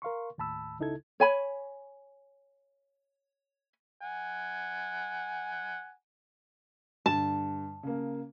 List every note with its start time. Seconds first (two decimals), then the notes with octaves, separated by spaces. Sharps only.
0.02 A#4 F5 C6 C#6
0.38 D#2 A2 A5 B5 E6
0.79 C#2 C#3 D#4 E4 A4 G#6
1.20 C#5 G#5 B5
4.01 F#5 G#5
7.06 G2 D3 A5
7.83 C#3 A#3